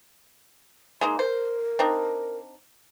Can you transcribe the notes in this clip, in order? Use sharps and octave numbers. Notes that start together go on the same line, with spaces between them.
G#3 A#3 D#4 C6
A#4 C5
C4 D4 D#4